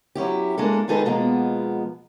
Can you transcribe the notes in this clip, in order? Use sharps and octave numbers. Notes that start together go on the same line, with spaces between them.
F#3 C#4 E4 G4
G#3 A#3 D4 A4
D#3 G#3 D#4 G#4 A4 B4
B2 F3 G#3 A#3 B3